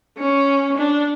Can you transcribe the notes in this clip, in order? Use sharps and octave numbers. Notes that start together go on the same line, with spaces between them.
C#4
D4